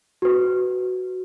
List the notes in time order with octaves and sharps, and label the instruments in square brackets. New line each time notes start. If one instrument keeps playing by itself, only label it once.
[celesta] F#4 B4